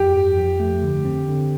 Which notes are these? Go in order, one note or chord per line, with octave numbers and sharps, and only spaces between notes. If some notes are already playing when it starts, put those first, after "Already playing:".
Already playing: F2 F3 G4
G2
F3
A3
D3
C4
D3